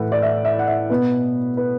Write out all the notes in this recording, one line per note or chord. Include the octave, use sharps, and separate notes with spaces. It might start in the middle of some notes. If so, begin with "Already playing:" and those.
Already playing: A2 E3 A3 B4 F#5
D5
E5
E5
F#5
E5
B2 B3 B4
B4